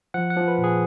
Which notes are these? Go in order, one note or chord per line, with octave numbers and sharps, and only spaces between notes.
F3 F#5
F#5
F3
B4
A#2
G#4